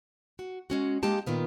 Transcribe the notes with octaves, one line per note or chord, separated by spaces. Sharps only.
F#4
G#3 C#4 F#4
G#3 A#3 D#4 G4 A5
A#2 D#3 B3 F4